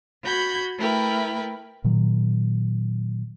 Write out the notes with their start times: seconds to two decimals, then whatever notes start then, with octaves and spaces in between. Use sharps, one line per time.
0.23 F#4 B5 G6 G#6
0.78 A3 E4 A#4 B4 G5
1.84 A#2 D#3 F#3